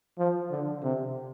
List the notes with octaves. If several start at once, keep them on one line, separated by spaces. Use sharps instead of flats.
F3
D3
C3